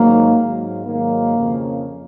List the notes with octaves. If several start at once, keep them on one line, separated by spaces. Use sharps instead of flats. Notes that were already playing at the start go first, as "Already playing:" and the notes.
Already playing: G#2 D#3 F#3 A#3
G#2 F#3
G#2 D#3 F#3 A#3
F2 C#3 F3